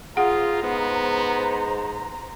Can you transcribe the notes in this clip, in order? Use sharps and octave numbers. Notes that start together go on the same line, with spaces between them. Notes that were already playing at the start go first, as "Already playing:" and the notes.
F4 G#4 C5 F#5 A#5
G#2 B3